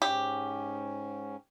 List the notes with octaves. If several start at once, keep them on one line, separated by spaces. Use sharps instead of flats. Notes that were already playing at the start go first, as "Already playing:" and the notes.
G#2 C#4 G4